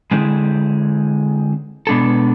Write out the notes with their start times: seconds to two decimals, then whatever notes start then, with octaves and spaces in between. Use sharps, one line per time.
0.11 D3 G#3 C4 E4 G#4
1.87 B2 G#3 B3 D4 A4